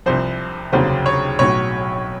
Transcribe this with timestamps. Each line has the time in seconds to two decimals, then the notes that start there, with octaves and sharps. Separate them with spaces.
0.06 C2 C3 F3 C5
0.73 F1 D#2 C#3 F#3 C5
1.06 C#5
1.39 B1 A2 F#3 C#5